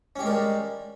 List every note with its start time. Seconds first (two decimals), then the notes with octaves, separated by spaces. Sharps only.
0.16 C#4
0.19 G4
0.23 G#3
0.26 A#4
0.29 G3